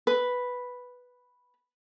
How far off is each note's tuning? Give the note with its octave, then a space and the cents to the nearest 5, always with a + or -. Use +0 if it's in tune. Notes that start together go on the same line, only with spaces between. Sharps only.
B4 +0